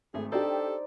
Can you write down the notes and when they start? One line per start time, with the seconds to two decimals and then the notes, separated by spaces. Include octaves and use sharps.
0.14 G#1 A3 G#4
0.32 D4 D#4 G4 A4 C5 D5